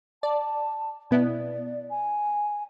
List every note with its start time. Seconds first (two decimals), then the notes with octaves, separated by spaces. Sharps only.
0.23 D5 A5
1.11 B2 B3 E4 D5
1.90 G#5